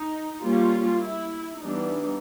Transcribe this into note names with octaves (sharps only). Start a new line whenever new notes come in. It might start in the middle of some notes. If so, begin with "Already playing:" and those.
Already playing: D#4
G3 A#3 C#4 F4
E4
E3 G3 B3 D4 D#4